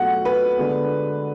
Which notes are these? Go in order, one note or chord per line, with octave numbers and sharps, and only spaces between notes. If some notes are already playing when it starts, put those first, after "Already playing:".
Already playing: B2 F#3 A3 F#5
B4
D3 G#3 B3